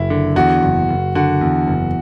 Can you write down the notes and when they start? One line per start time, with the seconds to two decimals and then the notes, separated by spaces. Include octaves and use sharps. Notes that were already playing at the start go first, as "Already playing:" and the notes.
Already playing: F#1 E4
0.10 D3
0.36 E2 F#4
0.62 F#1
0.89 F#1
1.15 D3 F#4
1.41 E2
1.68 F#1